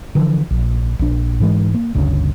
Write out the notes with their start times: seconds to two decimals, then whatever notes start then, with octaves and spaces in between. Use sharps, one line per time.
0.15 D3 E3 F3
0.51 A#1
0.99 A#1 D4
1.40 G#2 E3 G#3
1.74 A#3
1.95 G1 D2 C#3